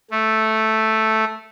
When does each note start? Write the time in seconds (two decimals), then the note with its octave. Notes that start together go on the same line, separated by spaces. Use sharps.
0.11 A3